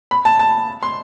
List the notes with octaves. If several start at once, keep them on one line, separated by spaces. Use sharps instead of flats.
B5
A5
A5
C6